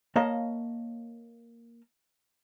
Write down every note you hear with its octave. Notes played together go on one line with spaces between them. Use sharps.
A#3 C#5 D#5 F5 A5